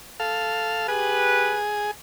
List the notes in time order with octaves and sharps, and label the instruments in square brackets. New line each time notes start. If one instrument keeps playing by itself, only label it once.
[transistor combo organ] A4 F5
[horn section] G4 B4 [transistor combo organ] G#4